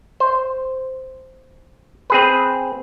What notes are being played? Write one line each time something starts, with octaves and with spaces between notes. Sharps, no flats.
C5
C4 G#4 B4